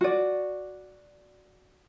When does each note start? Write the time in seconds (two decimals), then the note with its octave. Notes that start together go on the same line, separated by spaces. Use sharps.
0.01 F#4 D5